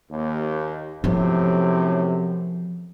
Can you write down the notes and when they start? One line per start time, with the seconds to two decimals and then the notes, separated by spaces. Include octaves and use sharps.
0.11 D#2
1.04 F#2 A2 C3 F3 B3